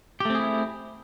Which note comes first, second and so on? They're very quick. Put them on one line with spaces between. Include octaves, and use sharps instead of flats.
G4 A3 C4 G#4 E4